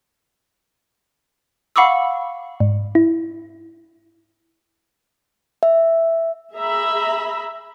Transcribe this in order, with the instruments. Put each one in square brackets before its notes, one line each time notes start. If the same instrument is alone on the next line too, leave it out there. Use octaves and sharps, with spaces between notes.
[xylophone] F5 F#5 B5 C#6 D6 E6
[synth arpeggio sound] G#2
E4
[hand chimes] E5
[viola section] G#4 E5 A#5 B5